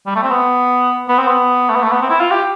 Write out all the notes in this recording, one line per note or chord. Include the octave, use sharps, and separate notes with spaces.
G3
A3
C4
B3
B3
C4
B3
A3
B3
A3
B3
C4
E4
F4
G4